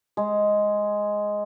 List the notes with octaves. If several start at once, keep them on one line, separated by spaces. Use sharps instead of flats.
G#3